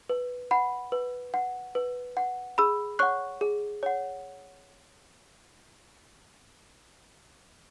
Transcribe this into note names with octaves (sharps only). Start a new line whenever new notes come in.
B4
F#5 B5
B4
F#5
B4
F#5
G#4 B5 E6
C#5 F#5 C#6 F#6
G#4
C#5 F#5